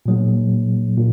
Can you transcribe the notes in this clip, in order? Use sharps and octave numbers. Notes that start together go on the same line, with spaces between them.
A#2 F#3 A#3
A#2